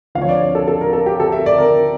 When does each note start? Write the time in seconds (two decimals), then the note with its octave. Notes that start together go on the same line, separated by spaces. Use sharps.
0.15 D2 D3 F3 F5
0.22 C#5
0.29 D5
0.42 C#5
0.55 A4
0.68 A4
0.81 A#4
0.93 A4
1.06 G4
1.20 A4
1.32 E5
1.46 D5
1.59 A#4